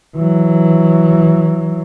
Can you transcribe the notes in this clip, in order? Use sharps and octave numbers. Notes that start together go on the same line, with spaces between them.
E3 F#3